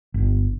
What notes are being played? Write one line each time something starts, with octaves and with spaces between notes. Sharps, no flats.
G1